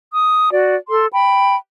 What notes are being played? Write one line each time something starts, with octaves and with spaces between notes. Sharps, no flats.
D#6
F#4 D5
A4 C6
G5 B5